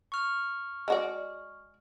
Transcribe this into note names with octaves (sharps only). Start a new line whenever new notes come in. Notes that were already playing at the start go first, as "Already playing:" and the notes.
C#6 F6
G#3 F#4 D5